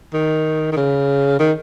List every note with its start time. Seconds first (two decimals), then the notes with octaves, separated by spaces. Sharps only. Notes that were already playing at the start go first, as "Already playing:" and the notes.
0.14 D#3
0.72 D#3
0.77 C#3
1.40 D#3